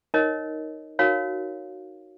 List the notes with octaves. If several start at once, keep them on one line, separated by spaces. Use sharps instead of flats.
D#4 A#4 C#5 D#5
D#4 F#4 A#4 C#5 F5